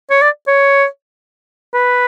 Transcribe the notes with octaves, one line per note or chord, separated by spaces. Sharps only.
C#5
D5
C#5
B4